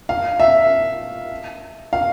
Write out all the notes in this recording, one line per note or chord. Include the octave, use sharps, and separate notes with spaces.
F5
E5
F5